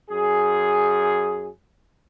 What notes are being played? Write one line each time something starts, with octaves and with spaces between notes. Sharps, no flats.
F#2 G#4